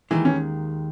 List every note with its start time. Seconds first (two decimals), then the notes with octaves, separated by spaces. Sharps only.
0.11 D#2 D#3 E3 G#3
0.25 C#4